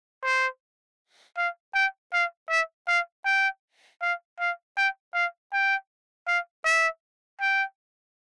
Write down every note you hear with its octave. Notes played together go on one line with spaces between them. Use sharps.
C5
F5
G5
F5
E5
F5
G5
F5
F5
G5
F5
G5
F5
E5
G5